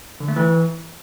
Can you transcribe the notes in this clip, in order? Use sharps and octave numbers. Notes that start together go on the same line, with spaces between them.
D3
A3
E3